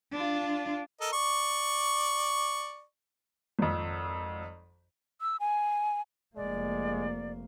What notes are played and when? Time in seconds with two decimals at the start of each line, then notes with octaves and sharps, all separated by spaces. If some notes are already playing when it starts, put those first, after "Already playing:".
0.12 D4 F4
1.01 A4 A#4 D#5
1.13 D5 C#6
3.59 G#1 F2
5.21 E6
5.40 G#5
6.36 F1 G#3 A#3 D5